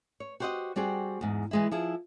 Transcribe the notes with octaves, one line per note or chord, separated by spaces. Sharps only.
C#5
F#4 G4 C5 C#5 D#5 F#5
G3 C4 F#4 G#4
E2 G#2
E3 G#3 E4
F3 E4 G#4